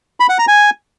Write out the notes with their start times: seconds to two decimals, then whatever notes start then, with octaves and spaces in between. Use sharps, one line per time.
0.20 B5
0.29 F#5
0.39 A#5
0.48 G#5